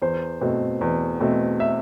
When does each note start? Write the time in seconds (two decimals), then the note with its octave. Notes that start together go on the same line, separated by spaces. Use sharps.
0.02 E2 C5
0.41 B2 A3 C4
0.81 E2
1.21 B2 A3 C4
1.60 E5